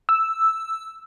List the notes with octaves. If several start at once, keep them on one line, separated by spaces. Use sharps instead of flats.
E6